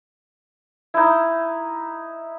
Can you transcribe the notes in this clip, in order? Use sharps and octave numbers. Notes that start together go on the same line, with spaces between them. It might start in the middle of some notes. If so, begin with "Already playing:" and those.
D#4 E4